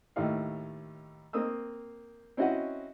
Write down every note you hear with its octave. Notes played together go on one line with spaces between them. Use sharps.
D#2 A2 F5
A#3 C4 D#6 E6
C4 C#4 E4 F#4 D#5 F#5